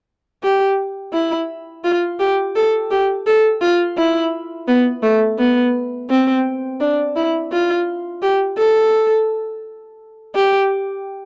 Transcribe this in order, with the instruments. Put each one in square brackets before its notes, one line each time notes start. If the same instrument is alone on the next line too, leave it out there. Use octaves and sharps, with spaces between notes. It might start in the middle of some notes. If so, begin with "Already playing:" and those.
[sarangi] G4
E4
F4
G4
A4
G4
A4
F4
E4
B3
A3
B3
C4
D4
E4
F4
G4
A4
G4